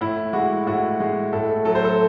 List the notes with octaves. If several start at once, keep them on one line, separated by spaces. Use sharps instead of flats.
A2 E4
G#3 F#4
A2 F#4
G#3
A2 A4
F#3 A3 A4
C5
A4